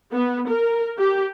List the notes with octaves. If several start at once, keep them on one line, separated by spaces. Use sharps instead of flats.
B3
A#4
G4